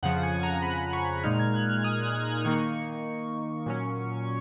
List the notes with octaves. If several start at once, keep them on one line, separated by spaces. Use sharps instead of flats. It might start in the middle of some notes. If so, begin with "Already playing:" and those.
F2 C#3 F3 F#5
G#5
A#5
B5
C#6
A#2 G#3 D#4 F6
G#6
F#6
F6
D#6
D#3 A#3 D#4 C#6
A#2 F#3 C#4